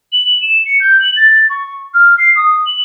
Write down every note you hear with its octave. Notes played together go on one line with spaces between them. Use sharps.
F#7
E7
C#7
G6
F#7
A6
C#6
F6
C7
D#6
F#7